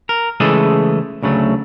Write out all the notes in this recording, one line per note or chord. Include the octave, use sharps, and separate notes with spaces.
A#4
C#3 E3 G#3 A3 G#4 A4
D2 C#3 F#3 A3